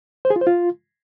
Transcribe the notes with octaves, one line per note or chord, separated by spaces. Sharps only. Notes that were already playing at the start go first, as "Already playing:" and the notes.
C5
G#4
F4
C5
F4